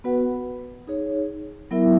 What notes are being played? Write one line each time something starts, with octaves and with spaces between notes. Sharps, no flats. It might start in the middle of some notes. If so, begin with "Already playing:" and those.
B3 F#4 B4 F#5
D#4 G#4 C#5
F#3 B3 E4 A#4 E5